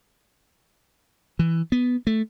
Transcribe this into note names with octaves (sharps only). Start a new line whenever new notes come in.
E3
B3
A3